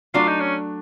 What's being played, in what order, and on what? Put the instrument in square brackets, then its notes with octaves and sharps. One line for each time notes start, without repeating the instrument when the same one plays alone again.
[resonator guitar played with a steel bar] F#3 A3 D4 [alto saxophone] F4
[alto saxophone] D#4
C#4